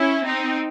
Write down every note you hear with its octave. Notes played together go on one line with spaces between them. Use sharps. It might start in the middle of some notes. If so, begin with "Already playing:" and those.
Already playing: C#4 E4
C4 D#4